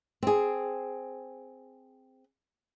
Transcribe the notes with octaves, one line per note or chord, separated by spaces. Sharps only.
C4 G#4